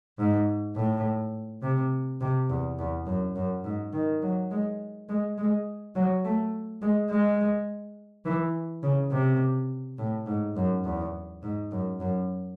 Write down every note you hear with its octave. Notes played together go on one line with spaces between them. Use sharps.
G#2
A2
C3
C3
E2
E2
F#2
F#2
G#2
D#3
F#3
G#3
G#3
G#3
F#3
A3
G#3
G#3
E3
C#3
C3
A2
G#2
F#2
E2
G#2
F#2
F#2